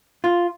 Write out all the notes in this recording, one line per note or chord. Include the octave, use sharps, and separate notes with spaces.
F4